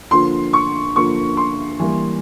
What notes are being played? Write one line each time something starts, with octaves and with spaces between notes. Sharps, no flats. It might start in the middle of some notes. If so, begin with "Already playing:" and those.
D3 F3 A#3 C6
C#6
D3 F3 A#3 C#6
C6
E3 G3 A#3